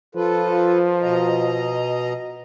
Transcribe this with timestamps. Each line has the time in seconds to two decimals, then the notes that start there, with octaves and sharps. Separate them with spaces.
0.15 F3 F4 A4 B4
1.02 B2 D#5 A#5